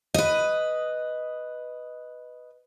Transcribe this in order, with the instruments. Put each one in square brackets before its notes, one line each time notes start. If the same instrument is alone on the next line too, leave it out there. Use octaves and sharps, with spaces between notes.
[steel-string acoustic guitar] B4 D#5